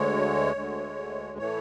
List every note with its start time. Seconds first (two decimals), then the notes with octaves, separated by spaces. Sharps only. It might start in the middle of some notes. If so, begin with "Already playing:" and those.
Already playing: D2 D3 G#3 C#5
0.56 D2 D3 G#3
1.38 A2 E3 A3 C#5